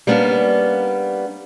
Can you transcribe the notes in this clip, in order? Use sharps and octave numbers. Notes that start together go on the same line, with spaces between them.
G3 A#3 B3 C#4 D4